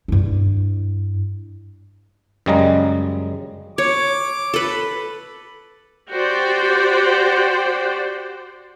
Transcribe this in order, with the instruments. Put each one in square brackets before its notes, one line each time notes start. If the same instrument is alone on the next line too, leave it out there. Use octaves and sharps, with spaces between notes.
[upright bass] G2 E4
[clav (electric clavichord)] F#2 C#3 G3 G#3 D#5 A#5
[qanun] C#5 [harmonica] D6
[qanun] A4 B4
[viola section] F#4 G4 C5 D5 G5